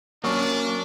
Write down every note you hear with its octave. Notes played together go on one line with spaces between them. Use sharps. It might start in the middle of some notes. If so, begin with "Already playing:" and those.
F#3 A#3 C#4 D4 C#6